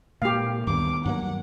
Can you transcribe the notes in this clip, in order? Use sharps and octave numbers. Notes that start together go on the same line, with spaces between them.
A#2 G#3 A#3 G4 F5
D2 G2 D#3 B3 D6
G2 F#3 A#3 F#5